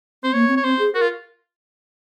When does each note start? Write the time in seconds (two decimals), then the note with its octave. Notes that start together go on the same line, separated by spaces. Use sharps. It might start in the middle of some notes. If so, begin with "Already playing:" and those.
0.23 C4 C5
0.33 A#3 C#5
0.48 C4
0.57 C#5
0.64 C4 C5
0.79 G#4
0.94 F#4 A#4
1.01 F4